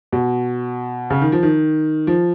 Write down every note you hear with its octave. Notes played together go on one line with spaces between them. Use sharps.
B2
C#3
D#3
F3
D#3
F3